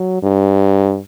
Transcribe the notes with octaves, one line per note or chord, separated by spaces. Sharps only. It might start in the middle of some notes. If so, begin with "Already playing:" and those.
Already playing: F#3
G2